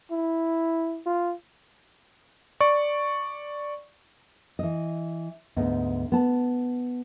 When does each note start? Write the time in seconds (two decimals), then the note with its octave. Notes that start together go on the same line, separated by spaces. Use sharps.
0.11 E4
1.06 F4
2.61 D5 C#6
4.59 E3 D#5
5.56 D2 G#2 B3 D#5
6.12 B3 A5